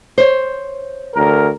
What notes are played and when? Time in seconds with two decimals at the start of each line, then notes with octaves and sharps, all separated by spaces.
0.18 C5 C#5
1.14 D2 A#4